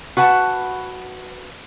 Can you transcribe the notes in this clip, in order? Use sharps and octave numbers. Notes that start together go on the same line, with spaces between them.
F#4 B4 F#5 A5